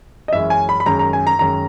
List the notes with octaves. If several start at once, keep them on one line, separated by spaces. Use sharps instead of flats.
D#5
F#2 E3 G#3 C#4 E5
G#5
B5
B5
F#2 D#3 G#3 A#5
A#5
G#5
A#5
F#2 D#3 G#3 A#5